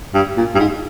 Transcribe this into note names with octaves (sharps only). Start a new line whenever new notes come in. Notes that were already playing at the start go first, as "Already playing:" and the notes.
G2
A#2
G2
G#2